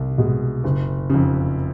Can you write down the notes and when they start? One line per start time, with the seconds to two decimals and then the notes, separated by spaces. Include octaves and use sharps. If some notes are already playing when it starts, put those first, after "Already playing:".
Already playing: C2
0.18 B2 G#3
0.64 F#1
1.10 F2 C#3